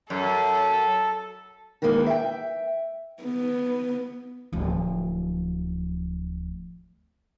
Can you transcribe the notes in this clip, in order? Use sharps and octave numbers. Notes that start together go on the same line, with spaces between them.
F#2 A4
D#3 E3 G#3 A#3 C#4 D#4
E5 G5
B3
D1 F3